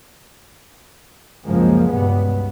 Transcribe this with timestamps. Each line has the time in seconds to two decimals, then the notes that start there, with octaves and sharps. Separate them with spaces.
1.45 C#2 F#2 F3 G#3 A#3
1.90 C#2 G2 B2 B3